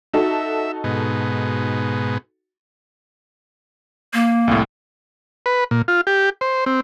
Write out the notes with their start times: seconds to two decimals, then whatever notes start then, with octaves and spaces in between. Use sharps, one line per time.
0.14 D#4 F#4 A4 E5
0.84 G#2 B2
4.14 A#3
4.48 C2 A2
5.46 B4
5.71 A#2
5.88 F4
6.07 G4
6.41 C5
6.66 C4